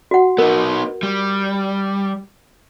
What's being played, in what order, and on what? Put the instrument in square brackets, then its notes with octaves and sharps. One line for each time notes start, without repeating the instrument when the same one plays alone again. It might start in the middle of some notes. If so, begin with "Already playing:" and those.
[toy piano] F#4 F#5
[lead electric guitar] B3 D#4 [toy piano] A#4
[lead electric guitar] G3